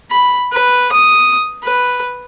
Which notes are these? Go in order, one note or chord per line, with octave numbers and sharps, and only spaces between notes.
B5
B4
D#6
B4